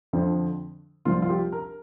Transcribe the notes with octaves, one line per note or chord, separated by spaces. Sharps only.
F2 D3 F3
C2 C3 F3 F4
F4
G4
A#4